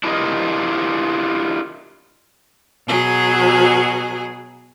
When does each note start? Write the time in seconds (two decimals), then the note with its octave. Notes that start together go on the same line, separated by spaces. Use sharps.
0.03 D4 E4 F4 G4 A#4 D#5
2.87 B2 F#3 G#4